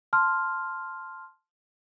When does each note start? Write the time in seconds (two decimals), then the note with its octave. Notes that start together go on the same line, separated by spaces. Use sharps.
0.13 A5 C6 F6